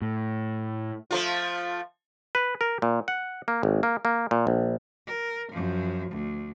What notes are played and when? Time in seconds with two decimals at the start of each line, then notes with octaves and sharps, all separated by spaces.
0.02 A2
1.11 F3 A3 F4
2.35 B4
2.61 A#4
2.82 A#2
3.08 F#5
3.48 A#3
3.63 G#1
3.83 A#3
4.05 A#3
4.31 A#2
4.47 A#1
5.07 A#4
5.52 F#2 F3
6.11 D2